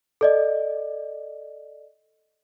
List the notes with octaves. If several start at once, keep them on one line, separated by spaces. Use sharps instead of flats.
A4 D5 D#5